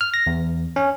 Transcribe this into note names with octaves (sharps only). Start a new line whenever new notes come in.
F6
A#6
E2
C#4